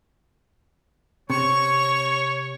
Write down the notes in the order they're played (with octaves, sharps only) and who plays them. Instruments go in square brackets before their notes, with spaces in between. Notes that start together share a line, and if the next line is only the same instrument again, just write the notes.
[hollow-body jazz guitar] C3 [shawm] C#5 [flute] C#6